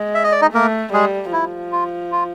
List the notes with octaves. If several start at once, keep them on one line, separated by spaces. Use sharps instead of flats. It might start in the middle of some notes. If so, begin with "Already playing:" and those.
Already playing: G#3
E5
D#5
D5
D#4 D#5
A3 A#3 A#4
G3 G#3 G#4
F3 E4
F4
F4